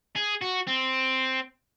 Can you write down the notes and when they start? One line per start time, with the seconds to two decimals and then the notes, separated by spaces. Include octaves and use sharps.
0.16 G#4
0.42 F#4
0.68 C4